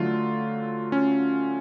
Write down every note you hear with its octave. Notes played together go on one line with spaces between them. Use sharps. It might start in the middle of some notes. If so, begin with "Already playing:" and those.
Already playing: D3 F#3 A3 F4
C#4